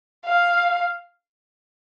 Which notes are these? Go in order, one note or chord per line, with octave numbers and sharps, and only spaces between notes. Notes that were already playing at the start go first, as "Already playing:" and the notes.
F5